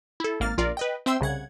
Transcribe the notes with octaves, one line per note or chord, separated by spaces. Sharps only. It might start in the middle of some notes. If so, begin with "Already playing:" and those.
E4 A4
G#1 A#3 F6 A6
A#1 F4 A#4 D5
B4 D#5 G5
C4 C5 E5 G5 C6 E6
C2 C#3 F#5 G#6